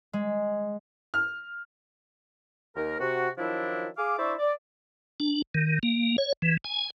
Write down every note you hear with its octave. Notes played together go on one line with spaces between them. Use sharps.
G#3
F6
D#2 A#4
C3 F#4
D#3 F3 F#3 D4 E4
G#4 F5 D6
D4 E4 C5 D5 E5 C#6
D5
D4
D#3
A#3
C#5
E3
G#5